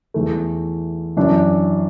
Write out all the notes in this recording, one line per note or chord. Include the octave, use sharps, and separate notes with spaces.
E2 E3 A3
F#2 E3 D4